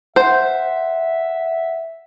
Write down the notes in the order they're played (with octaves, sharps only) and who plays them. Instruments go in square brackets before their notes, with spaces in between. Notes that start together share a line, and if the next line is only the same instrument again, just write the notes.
[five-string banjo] C5 [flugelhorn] E5 [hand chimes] F#5